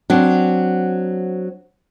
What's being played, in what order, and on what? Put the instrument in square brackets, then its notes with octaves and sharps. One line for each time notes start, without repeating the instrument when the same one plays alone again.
[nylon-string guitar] F#3 C4 D4